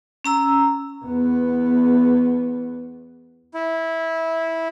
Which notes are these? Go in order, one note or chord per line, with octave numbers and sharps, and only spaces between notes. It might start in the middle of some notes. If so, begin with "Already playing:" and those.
C#4 A#5 E6
E2 B3
E4